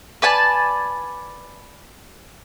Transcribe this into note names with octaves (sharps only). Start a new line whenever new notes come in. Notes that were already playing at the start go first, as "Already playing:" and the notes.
B4 D5 G#5 A5